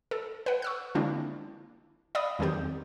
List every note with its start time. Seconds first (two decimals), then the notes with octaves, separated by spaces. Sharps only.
0.11 A4
0.46 B4 F#5
0.62 C#6 E6 F#6
0.95 D3 G#3 A#3 C4 D4 E4
2.15 D5 F5 B5 D#6
2.39 E2 D#3 F#3 C4 G4 G6